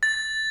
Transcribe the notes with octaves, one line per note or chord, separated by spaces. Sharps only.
A6